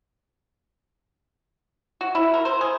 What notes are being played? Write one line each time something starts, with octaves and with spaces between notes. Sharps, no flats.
F#4
E4
A#4
C5
G#4